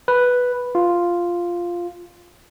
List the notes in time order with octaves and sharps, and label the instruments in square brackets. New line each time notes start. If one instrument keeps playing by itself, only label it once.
[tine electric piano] B4
F4